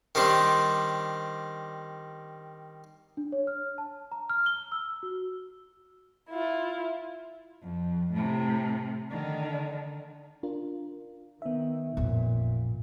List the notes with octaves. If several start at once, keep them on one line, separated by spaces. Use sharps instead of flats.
D#3 G3 C4 D4
D4
C#5
F6
A5
A#5
F6
G7
E6
F#4
E4 F4
F2
A2 C3
D3 D#3
D4 F4 A#4
D#3 B3 E5
A1 F2 A#2